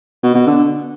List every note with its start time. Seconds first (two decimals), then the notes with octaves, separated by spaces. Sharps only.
0.23 B2
0.35 B2
0.47 D3